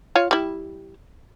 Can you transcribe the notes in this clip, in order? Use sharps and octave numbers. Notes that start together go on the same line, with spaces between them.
F4 C#5 F5
G3 E4